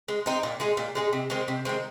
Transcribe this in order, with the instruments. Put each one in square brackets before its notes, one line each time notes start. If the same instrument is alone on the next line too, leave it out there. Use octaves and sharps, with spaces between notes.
[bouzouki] G#3
C4 D#4
A#2
G#3 D#4 G#4
A#2
G#3 D#4 G#4
C3
D#3 G#3 C4
C3
D#3 G#3 C4